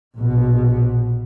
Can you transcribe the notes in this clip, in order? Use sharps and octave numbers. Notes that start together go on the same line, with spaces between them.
A#1 B2